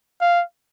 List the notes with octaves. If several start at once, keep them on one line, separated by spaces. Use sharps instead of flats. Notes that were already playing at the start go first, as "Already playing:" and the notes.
F5